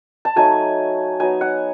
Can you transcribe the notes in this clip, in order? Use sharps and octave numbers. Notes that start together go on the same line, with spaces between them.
A5
F#3 A3 D#4 G#5
F#3 B3 D#4 G#5
F#5